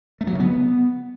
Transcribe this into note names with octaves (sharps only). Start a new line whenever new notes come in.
A3
F#3
C#3
B3